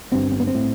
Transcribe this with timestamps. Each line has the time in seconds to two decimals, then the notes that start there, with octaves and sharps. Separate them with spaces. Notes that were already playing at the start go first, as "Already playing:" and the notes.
0.11 G1 G2 C4
0.32 C4
0.40 B3
0.47 C4
0.55 A2